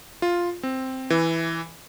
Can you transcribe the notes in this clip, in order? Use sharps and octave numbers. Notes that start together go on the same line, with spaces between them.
F4
C4
E3